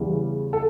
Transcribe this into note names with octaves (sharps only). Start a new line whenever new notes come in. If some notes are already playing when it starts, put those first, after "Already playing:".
Already playing: E2 C#3 E3 G3
A4